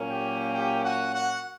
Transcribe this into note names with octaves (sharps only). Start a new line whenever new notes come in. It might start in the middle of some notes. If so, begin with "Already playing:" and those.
Already playing: A#2 F#3 A#3 C#4
G4 G5
G4 G5
F#4 F#5
F#4 F#5